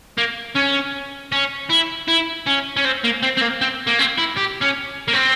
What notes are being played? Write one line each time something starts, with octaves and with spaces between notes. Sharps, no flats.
A#3
C#4
C#4
E4
E4
C#4
C#4
C4
A#3
C4
C4
A#3
C4
A#3
C4
E4
G4
C#4
A#3
C4